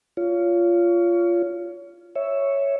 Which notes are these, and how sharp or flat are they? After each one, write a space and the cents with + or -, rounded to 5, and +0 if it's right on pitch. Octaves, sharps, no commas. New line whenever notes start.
F4 -10 C#5 +30
C#5 +0 E5 +0